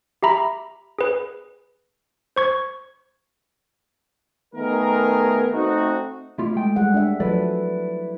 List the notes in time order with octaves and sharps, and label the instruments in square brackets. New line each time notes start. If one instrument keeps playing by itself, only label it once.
[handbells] G4 E5 A#5 B5
G#4 B4
C5 C#6 G#6
[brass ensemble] D#3 A3 B3 G#4 A#4
A3 C4 D#4 F#4
[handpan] A3 [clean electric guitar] E4 F4 G4
[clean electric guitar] G#3 G5
[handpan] G3 G#4 F#5
D4 E5
[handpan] F3 F#3 A4 [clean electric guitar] E4 B4 D5